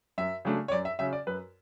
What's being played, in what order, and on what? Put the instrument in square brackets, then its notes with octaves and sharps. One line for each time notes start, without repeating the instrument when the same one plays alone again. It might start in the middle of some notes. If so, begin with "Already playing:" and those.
[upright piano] F#2 E5
C#3 F#3 A3 D4
C#5
F#2 D5
E5
C#3 F#3 C#4 E5
D5
F#2 B4